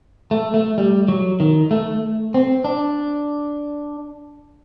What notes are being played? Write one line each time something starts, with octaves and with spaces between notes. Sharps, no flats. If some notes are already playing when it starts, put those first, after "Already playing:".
A3
A3
G3
F#3
D#3
A3
C4
D4